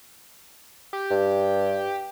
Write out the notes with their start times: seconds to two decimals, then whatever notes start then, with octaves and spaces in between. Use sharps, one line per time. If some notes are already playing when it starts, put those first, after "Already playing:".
0.93 G4
1.11 G2